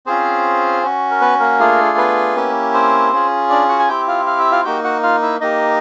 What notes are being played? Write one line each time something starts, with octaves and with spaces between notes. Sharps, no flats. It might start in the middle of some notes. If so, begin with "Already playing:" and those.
C4 C#4 F4 G#4 C5
C#4 F#4
A#4
B3 B4
A#3 A#4
A3 D4 F4 G#4
B3 B4
A#3 C#4 E4 G4
C4 C5
C#4 F4 G#4
D4 D5
F#4 F#5
G#5
C4 E4 G4 G5
F4 F5
F5
E5
F4 F5
A#3 D#4 F#4 G4 G5
F#4 F#5
F4 F5
E4 E5
A#3 D#4 G4 D#5